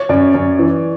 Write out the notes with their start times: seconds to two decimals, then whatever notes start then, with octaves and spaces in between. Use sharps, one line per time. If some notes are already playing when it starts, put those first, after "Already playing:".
Already playing: C#5
0.09 F#2 D5
0.34 F#2
0.59 E3